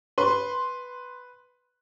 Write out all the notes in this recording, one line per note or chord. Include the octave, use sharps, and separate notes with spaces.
B4 C6